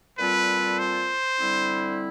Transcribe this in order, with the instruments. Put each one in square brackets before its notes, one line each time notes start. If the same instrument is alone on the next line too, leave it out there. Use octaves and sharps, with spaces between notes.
[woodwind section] A#2 G3 C4 F4 A4 [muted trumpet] B4
[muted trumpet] C5
[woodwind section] D3 G3 C4 E4